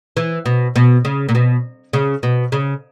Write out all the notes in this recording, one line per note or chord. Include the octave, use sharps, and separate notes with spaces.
E3
B2
B2
C#3
A#2
B2
C#3
B2
C#3